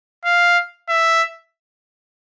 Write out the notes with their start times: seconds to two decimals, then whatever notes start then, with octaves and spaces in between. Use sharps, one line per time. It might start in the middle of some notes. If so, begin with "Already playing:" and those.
0.25 F5
0.89 E5